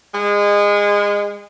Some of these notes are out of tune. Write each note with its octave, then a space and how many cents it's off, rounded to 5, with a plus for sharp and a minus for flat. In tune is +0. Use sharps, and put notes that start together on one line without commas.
G#3 -25